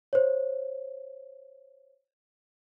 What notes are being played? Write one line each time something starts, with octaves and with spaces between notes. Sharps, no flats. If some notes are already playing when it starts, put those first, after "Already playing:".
C5 C#5